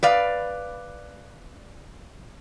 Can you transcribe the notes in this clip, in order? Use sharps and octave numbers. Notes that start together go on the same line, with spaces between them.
B4 D5 F5